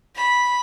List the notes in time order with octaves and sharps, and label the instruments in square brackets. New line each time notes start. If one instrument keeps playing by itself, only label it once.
[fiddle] B5